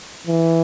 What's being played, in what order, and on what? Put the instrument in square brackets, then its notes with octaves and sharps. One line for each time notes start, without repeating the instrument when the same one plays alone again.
[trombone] E3